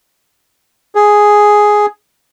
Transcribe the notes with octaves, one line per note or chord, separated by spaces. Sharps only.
G#4